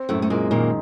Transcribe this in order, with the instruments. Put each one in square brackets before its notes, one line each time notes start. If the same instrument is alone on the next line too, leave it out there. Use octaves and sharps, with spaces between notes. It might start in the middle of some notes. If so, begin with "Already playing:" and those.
Already playing: [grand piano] C4
[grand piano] F#2 [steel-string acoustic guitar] A2 A3
[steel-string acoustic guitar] A3
[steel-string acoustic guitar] A#2 A#3 [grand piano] G#3
[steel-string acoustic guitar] A#2 A#3 [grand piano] D#3